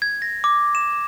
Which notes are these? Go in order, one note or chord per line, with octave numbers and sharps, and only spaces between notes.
G#6
A#6
D6
E7